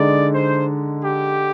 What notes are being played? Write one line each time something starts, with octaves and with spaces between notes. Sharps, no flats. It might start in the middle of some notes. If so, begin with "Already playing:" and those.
Already playing: D3 G#3 D#4 D5
C5
G4